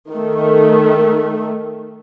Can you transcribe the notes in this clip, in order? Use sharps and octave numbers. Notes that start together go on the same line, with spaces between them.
D#3 A3